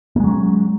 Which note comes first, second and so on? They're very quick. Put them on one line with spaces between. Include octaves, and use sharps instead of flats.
A#3 G#3 F#3 C#4